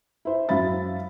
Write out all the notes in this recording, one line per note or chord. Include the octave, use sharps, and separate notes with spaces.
E4 C5
F#2 F#3 E5 F5 B5 A6